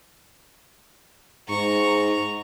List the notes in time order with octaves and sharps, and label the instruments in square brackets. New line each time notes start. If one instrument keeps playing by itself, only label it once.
[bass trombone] G#2 [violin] A#5 C#6